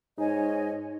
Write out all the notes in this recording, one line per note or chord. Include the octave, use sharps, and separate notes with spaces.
G#2 D#4 C#5 D#5 G#5